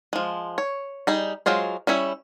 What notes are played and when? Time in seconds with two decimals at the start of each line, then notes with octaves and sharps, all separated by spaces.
0.13 F3 G#3
0.58 C#5
1.07 G3 D#4 G#4
1.46 F#3 G#3 F4 G#4 C5
1.87 G3 C#4 E4 C#5